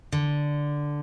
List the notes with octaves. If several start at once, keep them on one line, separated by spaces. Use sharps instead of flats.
D3